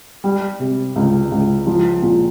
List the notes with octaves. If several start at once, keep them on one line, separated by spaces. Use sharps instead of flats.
G3
C3
C#2
C#2
F3
A#2